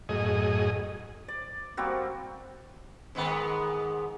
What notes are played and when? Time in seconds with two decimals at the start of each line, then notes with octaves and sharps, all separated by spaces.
0.09 F#2 A2 G#4 D#5
1.28 D5
1.77 G3 A#3 C4 F#4
3.15 G#2 D#3 B3